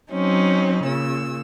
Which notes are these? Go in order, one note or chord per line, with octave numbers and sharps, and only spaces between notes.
F#3 C4 C#4 D#4
A#2 C#3 E6